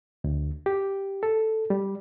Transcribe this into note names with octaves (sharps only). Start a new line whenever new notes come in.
D2
G4
A4
G3